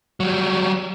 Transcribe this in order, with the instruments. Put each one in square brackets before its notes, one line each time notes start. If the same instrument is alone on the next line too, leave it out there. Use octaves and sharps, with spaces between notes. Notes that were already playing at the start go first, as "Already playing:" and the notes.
[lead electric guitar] F#3 G3